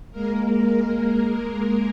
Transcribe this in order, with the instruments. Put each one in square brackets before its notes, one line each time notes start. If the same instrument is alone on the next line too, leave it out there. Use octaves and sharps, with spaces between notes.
[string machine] G#3 A#3 A#4